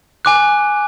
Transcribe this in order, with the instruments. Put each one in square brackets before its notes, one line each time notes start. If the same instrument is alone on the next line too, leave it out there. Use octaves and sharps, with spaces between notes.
[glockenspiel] G#5 D6 F#6